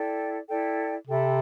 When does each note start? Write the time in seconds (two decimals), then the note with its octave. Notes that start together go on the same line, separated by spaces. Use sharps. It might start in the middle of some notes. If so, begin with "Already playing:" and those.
Already playing: E4 A4 D5 G5
0.49 E4 A4 D5 G5
1.07 C3 A4 E5 G5 B5